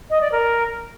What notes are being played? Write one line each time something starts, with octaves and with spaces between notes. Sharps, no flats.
D#5
D5
A#4